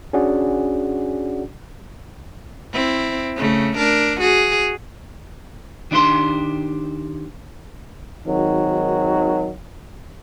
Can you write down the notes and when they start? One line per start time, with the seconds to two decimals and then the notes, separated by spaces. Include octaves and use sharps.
0.13 C#4 D4 F#4 G#4 D5 F#5
2.73 C4 E4
3.36 C#3 A3
3.77 D4 A#4
4.20 F#4 G#4
5.91 D#3 D4 E4 G4 C5 C6
8.26 G#1 D#3 F#3